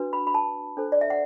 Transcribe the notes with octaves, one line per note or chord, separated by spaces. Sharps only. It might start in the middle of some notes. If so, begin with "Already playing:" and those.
Already playing: D4 F#4 B4
B5
B5
A5
D4 A4 C5
D5
E5
F#5